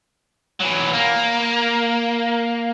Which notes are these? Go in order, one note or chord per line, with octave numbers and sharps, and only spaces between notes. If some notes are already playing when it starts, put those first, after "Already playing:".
E3 F#3
A#3